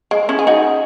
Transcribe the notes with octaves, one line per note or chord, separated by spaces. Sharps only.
G#3
C#4 E4
G#4
D#4 F#4